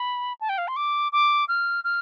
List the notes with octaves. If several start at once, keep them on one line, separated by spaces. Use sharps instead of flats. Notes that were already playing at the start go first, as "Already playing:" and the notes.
Already playing: B5
A5
G5
F5
C6
D6
D6
F6
F6